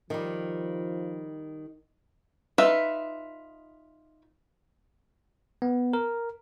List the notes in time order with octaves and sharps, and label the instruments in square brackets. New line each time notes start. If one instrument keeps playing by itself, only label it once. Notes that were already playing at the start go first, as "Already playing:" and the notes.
[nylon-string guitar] D#3 G3 [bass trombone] F3
[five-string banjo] D#4 F4 B4 E5
[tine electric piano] B3
A#4